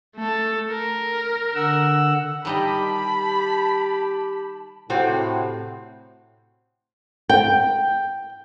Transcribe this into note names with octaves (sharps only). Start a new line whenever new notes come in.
A3 A4
A#4
D3 F#5 E6
D#3 G3 G4 D#5 A5 B5
A2 C3 C4 F#4
G5